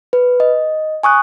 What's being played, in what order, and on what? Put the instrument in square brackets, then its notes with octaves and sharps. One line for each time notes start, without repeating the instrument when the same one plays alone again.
[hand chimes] B4
D#5
G#5 C#6 D#6 F#6